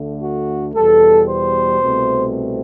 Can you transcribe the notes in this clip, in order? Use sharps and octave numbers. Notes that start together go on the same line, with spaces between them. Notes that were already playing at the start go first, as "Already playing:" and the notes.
Already playing: D2 D3 A3
F#4
E2 B2 G3 A4
C5
C2 B2 A3 C4